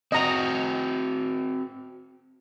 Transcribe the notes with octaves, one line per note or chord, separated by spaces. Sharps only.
C4 F#4 D#5 A#5